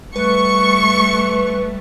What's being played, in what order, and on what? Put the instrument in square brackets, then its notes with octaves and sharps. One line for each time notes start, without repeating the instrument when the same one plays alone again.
[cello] G3 A3 [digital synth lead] B4 [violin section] C#6